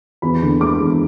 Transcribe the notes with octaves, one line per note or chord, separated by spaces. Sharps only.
E2 B5
D3
G#3 D6
E2